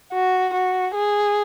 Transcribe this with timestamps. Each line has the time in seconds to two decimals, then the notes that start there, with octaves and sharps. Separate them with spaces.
0.14 F#4
0.54 F#4
0.95 G#4